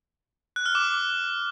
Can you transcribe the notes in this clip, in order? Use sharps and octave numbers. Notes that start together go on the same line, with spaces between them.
F#6
F6
D6